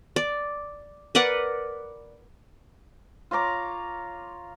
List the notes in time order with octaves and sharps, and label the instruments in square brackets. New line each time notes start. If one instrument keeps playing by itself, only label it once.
[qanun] D5
A#4 B4 D5 F#5
[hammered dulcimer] F4 C#5 A#5 D6